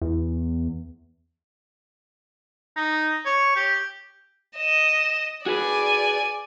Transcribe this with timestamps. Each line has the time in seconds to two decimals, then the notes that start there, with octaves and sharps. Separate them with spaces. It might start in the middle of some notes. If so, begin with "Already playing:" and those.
0.02 E2
2.76 D#4
3.25 C#5
3.56 G4
4.57 D#5 E7
5.46 F#4 G#4 B4 D5 G#5